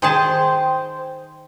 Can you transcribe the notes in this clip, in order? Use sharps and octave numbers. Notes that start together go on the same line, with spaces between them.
D#3 G#4 C5 G5 A5